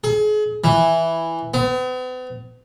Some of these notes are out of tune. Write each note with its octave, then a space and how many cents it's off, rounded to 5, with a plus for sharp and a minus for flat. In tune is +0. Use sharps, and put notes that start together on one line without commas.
G#4 +35
E3 +0
B3 +45